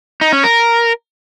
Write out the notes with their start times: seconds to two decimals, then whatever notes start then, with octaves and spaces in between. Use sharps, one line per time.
0.21 D#4
0.32 C#4
0.44 A#4